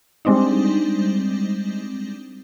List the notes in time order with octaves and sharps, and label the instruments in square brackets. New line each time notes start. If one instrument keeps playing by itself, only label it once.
[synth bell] G3 G#3 C4 D4 D#4